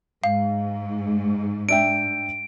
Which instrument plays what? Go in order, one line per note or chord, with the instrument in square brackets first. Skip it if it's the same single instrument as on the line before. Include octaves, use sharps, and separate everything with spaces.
[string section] G#2 [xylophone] F5
[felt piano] D4 E5 G5 [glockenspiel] D7